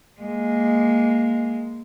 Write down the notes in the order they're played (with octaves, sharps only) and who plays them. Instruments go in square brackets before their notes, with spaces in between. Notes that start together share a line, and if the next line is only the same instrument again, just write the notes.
[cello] G#3 A#3